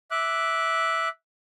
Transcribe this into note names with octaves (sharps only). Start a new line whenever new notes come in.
E5 D6 F#6